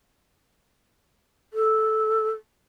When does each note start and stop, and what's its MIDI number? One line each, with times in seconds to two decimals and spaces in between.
1.53 2.31 69